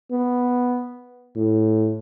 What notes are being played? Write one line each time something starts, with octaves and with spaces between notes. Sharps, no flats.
B3
A2